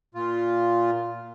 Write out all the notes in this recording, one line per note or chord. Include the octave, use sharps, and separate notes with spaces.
A#2 F4